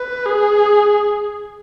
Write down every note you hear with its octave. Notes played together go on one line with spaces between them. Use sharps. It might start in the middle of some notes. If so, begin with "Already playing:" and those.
Already playing: B4
G#4